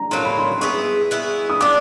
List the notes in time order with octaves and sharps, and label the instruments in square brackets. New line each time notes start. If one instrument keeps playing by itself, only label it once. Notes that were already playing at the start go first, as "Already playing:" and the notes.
Already playing: [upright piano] A#5
[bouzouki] A2 F#3 A#3 [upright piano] C6
[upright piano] B5
C6
[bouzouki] B3 E4 G#4 [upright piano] C#6
[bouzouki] B3 E4 G#4
[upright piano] D#6
[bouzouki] B3 D4 [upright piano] D6